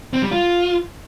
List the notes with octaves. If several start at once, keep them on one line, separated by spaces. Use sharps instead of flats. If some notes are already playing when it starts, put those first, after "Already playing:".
C4
G3
F4